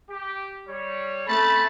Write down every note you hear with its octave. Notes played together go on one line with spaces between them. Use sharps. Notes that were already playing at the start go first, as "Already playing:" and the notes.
G4
G3 C#5
A3 C4 C#4 A5 B5